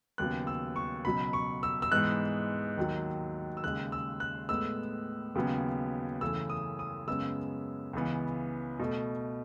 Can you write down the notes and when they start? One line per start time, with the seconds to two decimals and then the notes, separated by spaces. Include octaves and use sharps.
0.18 D#2 C#3 F#3 B3 F#6
0.47 E6
0.76 C#6
1.05 C#2 B2 F#3 B5
1.33 C#6
1.63 E6
1.82 E6
1.91 G#2 E3 G#3 B3 F#6
2.77 D#2 D#3 F#3
3.57 E6
3.64 D#2 C#3 G#3 F#6
3.92 E6
4.20 F#6
4.49 A2 G#3 B3 E6
5.35 D#2 C#3 F#3 B3
6.21 F#2 C#3 E3 A3 E6
6.50 D#6
6.79 D#6
7.07 F#2 C#3 G#3 B3 E6
7.93 C#2 C#3 E3 B3
8.80 B2 A3